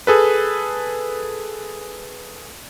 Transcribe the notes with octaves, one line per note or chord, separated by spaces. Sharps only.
G#4 A4 B4